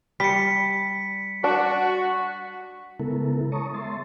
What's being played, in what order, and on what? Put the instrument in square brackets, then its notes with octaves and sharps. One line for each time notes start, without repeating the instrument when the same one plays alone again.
[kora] G3 [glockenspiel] B6 C#7
[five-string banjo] D4 [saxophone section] F#4
[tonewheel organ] C#3 G#3 B3 E4 A4 A#4
C#5 A5 A#5 C#6 D#6
G#3 E5 C6 A6